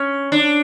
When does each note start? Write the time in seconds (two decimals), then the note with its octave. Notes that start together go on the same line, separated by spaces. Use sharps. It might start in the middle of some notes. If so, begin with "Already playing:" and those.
Already playing: C#4
0.32 D4